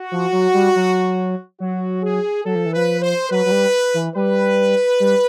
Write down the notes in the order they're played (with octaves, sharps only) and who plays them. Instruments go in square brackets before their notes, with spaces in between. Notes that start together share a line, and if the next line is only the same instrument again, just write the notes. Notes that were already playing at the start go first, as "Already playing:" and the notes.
Already playing: [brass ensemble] F#4
[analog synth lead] F3
F#3
G3
F#3
[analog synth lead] F#3 [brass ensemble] F#4
[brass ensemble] G#4
[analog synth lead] F#3 [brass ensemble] A4
[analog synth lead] F3
E3
[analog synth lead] F3 [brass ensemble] B4
[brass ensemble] C5
[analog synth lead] F#3 [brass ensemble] B4
[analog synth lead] F#3
G3
E3
[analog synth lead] G3 [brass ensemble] B4
[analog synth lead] G3